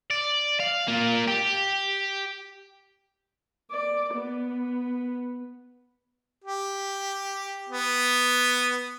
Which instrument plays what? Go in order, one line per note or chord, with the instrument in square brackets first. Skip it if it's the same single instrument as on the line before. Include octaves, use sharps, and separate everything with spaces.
[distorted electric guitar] D5
F5
A#3 F4
G4
[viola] D5
B3
[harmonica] G4
B3